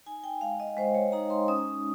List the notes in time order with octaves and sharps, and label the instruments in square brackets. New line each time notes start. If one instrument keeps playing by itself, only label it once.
[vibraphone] D#4 G#5
G5
G#3 F5
D#5
G#3 C5
C#5
D#4 A#5
C6
C#4 D#6